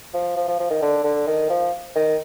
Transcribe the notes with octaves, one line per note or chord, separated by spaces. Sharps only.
F3
F3
F3
F3
D#3
D3
D3
D#3
F3
D#3